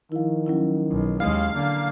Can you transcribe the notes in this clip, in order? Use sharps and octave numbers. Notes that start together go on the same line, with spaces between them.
D#3 F3 E4
F#3 C#4 E4
B1
D#2 G#3 F5
D3 A#3